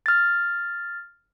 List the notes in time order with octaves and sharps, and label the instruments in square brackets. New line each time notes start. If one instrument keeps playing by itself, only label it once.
[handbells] F6 A6